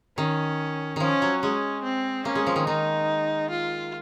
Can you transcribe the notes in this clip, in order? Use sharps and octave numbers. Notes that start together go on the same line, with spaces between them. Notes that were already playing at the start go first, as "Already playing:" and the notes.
D#3 C#4
D#3 F3 C#4
F#3
G#3 C#4
C4
A#3 C#4
G#3
F3
D#3
D#3 D#4
F4